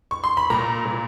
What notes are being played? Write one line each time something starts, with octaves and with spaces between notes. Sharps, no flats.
C#6
C6
B5
A#2 A#5
A#2